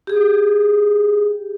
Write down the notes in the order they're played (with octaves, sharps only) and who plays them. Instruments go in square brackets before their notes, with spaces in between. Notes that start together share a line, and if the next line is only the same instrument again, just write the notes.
[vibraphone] G4 G#4